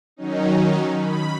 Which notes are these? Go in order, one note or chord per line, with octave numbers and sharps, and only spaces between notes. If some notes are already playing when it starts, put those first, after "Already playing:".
D#3 F#3 C#4 D#4
B5